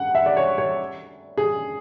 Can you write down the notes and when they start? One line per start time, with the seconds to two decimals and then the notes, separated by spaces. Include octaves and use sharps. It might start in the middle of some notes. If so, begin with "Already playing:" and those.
Already playing: F#5
0.15 E5
0.26 D5
0.37 C#5
0.58 C#5
1.38 G#4